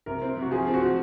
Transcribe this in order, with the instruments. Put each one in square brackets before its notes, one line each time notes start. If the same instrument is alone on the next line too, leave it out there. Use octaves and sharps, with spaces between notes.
[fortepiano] C3 [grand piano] A#4
[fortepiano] C4
C3
[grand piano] F#4
[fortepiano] F3 [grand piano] G#4
[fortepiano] C4
[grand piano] F#4
[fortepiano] F3